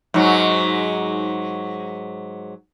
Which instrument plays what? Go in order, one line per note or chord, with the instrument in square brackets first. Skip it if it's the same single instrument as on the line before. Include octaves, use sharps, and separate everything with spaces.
[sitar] G#2 F#3